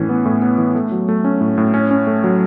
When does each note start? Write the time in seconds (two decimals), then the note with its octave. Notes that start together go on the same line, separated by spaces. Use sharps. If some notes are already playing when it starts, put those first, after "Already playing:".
Already playing: A2 E3 C#4
0.09 B3
0.25 A2
0.42 B3
0.58 E3
0.75 A3
0.92 F#3
1.09 A3
1.24 C#4
1.41 A2
1.58 A2
1.74 C#4
1.91 C#4
2.07 A3
2.24 F#3